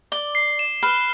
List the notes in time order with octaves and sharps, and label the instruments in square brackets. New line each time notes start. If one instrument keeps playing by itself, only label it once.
[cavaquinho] D5 [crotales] G7
[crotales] C7
E7
[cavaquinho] B4 [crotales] F6